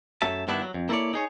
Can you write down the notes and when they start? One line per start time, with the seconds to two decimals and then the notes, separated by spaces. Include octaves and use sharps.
0.22 F#2 F#3 A3 E5 A5
0.48 G2 D#3 B3 D4 E4
0.62 F#3
0.74 F2
0.89 A#3 E4 A4 A#4 C#5 D5
1.14 D#4 G#4 C#5